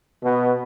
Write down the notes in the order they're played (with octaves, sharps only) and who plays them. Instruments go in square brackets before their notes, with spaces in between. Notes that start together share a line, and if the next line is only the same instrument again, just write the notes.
[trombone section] B2